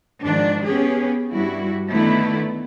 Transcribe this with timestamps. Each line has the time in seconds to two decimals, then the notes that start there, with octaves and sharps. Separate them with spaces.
0.22 G#2 D#3 F3 D4
0.64 B3 C#4 G4 G#4
1.32 G2 G3 E4 F#4
1.91 D3 D#3 A3 B3 E4